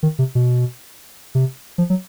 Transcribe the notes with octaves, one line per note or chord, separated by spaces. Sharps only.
D#3
C3
B2
C3
F3
F#3